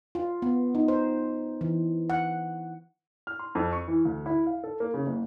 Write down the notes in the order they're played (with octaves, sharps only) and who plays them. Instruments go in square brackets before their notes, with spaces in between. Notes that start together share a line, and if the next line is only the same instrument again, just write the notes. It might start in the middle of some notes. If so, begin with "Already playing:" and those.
[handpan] F4
B3
D#4
C5
E3
F#5
[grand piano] F6
C6
F2
C#6
E3
D2
E4
F5
A4
A#3
C#3
F#1